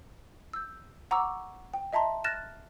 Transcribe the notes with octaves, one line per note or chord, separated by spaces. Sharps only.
E6 G6
F#5 A#5 C#6 D6 E6
G5
D#5 E5 A5 A#5 C6
F6 F#6 A6 A#6 E7